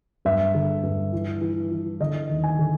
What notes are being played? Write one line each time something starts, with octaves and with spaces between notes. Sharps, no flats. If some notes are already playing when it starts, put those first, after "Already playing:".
G2 E5
D3
G2
E3
E3
E3
D3 D#5
D#2
G#5
D3